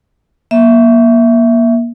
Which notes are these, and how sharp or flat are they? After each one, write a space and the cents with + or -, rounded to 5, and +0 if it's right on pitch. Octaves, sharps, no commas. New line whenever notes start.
A#3 +25 E5 +0